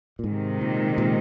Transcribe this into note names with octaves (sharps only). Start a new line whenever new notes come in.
A#2
G#2 C3 D#3 G#3
A#2
A#2